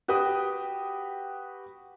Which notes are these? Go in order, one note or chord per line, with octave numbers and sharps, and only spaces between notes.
F#4 G4 B4 G5 D#6